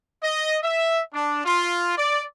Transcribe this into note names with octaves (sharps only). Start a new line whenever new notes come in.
D#5
E5
D4
F4
D5